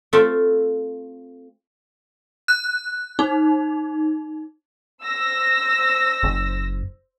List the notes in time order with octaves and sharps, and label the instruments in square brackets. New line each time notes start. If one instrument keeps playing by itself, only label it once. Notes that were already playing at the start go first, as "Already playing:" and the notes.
[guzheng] A3 C4 F4 E5
[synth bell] F#6
D#4
[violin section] C5 E6 A#6
[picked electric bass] F#1